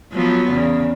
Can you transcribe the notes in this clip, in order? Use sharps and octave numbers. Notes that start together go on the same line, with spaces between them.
F3 F#3 B3
E2 C#3